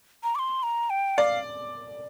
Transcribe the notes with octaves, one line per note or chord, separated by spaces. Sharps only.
A#5
D6
C6
A#5
G5
D5 F5